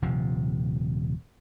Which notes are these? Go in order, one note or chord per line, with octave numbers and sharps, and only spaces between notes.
D#1 C3 F3